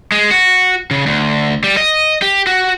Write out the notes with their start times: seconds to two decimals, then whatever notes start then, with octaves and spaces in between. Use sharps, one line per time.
0.12 G#3
0.31 F#4
0.91 C#3
1.06 D2
1.64 G3
1.77 D#5
2.22 G4
2.47 F#4